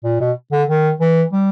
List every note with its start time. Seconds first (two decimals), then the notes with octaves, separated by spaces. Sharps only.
0.04 A#2
0.20 B2
0.52 D3
0.68 D#3
1.00 E3
1.32 G3